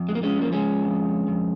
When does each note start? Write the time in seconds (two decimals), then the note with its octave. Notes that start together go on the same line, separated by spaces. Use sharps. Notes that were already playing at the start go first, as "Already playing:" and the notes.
Already playing: F2
0.09 G#3
0.15 A#3
0.23 G#3 C#4
0.39 F3 A#3
0.53 G#3 C#4
0.83 F2
1.28 F2